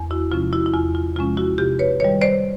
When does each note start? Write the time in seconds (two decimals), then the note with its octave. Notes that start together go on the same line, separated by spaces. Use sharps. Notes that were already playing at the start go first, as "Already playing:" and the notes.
Already playing: E2
0.11 E4 F#4
0.32 C3 F3 G#3 C#4 F4
0.53 E4 F#4
0.66 E4
0.74 E2 F4
0.95 F4
1.16 C3 F3 G#3 C#4 F4
1.37 E4 F#4
1.58 C3 F4 G4
1.79 B4 C#5
2.00 D#3 G3 B4 C#5
2.21 C5 D5